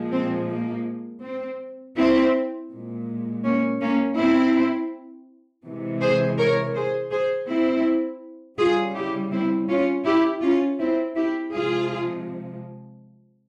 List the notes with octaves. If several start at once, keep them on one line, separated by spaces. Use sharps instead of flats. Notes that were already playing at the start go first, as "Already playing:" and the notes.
Already playing: A#2 F3 G#3
C4
A#3
C4
C4 E4
A#2 G#3
A#3 C#4
A#3 C#4
C4 E4
C3 E3 G#3
G#4 C5
A#4 C#5
G#4 C5
G#4 C5
C4 E4
C#3 G3 F4 G#4
E4 G4
C4 E4
C#4 F4
E4 G4
C#4 F4
C4 E4
E4 G4
C3 F3 G#3 F4 G#4